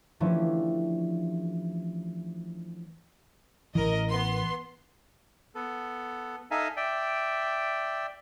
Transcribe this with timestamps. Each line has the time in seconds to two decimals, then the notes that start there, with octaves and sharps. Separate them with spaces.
0.20 E3 F3 A3 C#4 D4 G4
3.75 A1 E3 A#4 D#5
4.08 B3 C6
5.55 B3 A4
6.51 D#4 A4 E5 F5 G#5 A#5
6.77 D5 E5 G5